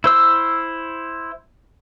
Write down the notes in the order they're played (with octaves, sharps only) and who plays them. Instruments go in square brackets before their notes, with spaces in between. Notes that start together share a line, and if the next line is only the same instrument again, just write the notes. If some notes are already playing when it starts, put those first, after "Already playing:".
[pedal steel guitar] E4 C5 E6